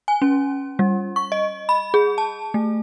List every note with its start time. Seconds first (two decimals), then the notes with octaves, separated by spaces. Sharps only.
0.08 G#5
0.22 C#4
0.79 G3
1.16 C#6
1.32 D#5
1.69 B5
1.94 G#4
2.18 A5
2.54 A3